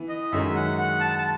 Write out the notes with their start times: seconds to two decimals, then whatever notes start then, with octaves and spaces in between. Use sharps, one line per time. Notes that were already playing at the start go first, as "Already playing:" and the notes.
Already playing: E3 B3 E4
0.09 D#5
0.32 F#2 D#3 G#3 D#4 E5
0.55 F#5
0.78 F#5
1.00 A5
1.18 A5